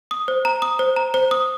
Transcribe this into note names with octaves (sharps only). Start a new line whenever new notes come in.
D#6
C5
A#5
D#6
C5
A#5
C5
D#6